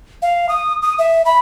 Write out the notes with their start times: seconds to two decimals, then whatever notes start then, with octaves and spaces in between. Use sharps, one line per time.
0.22 F5
0.49 D#6
0.82 D#6
0.99 E5
1.25 B5